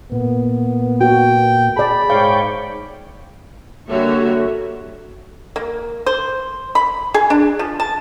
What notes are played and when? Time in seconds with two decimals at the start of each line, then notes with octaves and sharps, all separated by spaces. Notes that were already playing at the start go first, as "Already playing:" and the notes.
0.12 A#2 B3
1.01 F#4 G5
1.77 G#4 D5 A5 B5
2.10 G#2 C#5 D5 F5 G5
3.88 D3 G3 A#3 F#4 C#5 E5
5.56 A#3
6.06 C5
6.75 B5
7.14 G#4
7.30 D4
7.59 F3
7.80 A5